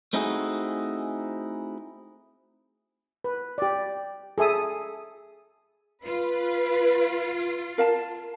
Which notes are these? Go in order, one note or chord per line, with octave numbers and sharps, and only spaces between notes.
A3 C4 D#4 E4 F#4 G#4
B4
G4 D5
G#4 A4 E5 D#6
F4 B4
A#4 F5 A5